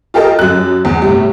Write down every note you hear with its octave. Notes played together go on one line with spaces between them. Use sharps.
F4 G4 A4 A#4 D#5
F#2 F#6
E2
A2 C3 G3